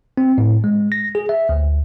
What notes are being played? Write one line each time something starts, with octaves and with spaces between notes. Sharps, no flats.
C4
A2
G#3
A#6
G#4
E5
D2